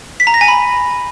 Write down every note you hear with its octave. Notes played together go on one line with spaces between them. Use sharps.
B6
A#5
A#6
G#5
B5